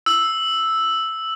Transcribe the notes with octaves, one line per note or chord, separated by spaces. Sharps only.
E6